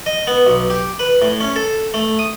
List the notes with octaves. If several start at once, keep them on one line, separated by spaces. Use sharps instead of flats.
D#5
B3
B1
G4
B4
A2
C#4
A4
A3
D#6